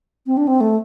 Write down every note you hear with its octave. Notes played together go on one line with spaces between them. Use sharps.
C4
D4
C4
A3